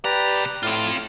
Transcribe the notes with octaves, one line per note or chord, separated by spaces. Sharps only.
B2 G4 B4 D5 A#5
A2 C4 F4